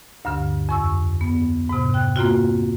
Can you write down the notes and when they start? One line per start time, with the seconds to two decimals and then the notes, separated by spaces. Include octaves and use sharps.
0.25 D2 G2 D3
0.69 F2 C#6 E6
1.21 B3
1.69 G#2 C3
1.94 G5 F#6
2.16 A#3 C4 F4 F#4